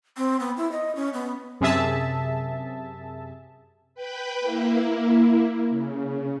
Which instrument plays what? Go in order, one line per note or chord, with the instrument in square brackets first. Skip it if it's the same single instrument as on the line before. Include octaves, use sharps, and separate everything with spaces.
[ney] C4
B3
E4
D#5
C#4
B3
[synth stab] F#2 C3 G#4 E5 A5
[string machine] B4 G5 B5
A#3 E4
C#3